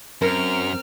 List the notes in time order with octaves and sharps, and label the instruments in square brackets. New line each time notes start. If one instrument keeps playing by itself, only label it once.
[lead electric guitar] F#2 [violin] C4 F6 [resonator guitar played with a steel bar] A#4